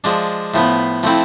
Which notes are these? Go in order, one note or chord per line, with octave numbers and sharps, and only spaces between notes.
F3 G#3 D4
A2 F3 B3
F3 A3 C4 E4